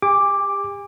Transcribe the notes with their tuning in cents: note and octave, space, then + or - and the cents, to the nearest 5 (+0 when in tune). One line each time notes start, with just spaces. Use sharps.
G4 +35 G#5 -40 D6 +5